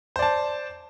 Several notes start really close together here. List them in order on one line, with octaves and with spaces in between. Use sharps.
C5 D5 A5